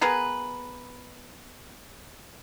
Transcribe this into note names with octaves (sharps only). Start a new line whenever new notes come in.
B3 G#4 A#4 B4